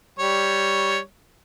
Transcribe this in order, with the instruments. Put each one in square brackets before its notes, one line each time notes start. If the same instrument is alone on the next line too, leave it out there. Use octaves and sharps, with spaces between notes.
[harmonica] G3 C#5